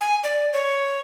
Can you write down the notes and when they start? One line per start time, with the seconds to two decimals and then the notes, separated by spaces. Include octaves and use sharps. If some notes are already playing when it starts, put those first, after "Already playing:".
0.01 G#5
0.24 D5
0.53 C#5